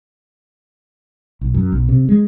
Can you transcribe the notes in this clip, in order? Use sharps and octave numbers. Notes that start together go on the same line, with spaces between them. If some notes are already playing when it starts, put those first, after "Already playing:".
B1
F#2
B1
C3
G#3